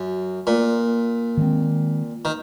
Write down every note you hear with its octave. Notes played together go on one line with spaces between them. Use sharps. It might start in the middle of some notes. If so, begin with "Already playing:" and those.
Already playing: F#2
A#2
D#3 G#3 C4
D#3